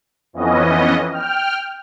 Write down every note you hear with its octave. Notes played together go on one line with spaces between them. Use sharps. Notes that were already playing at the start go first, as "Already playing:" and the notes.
F2 E3 B3 C#4 D#5
G5 F6